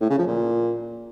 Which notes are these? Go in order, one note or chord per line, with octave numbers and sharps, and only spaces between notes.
A2
C#3
F3
A#2